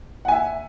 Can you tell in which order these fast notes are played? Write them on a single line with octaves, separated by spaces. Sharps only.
F#5 G#5 E5